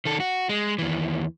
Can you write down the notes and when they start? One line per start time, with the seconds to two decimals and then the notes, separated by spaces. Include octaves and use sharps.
0.05 D#3 A4
0.20 F#4
0.49 G#3
0.79 D#2 E3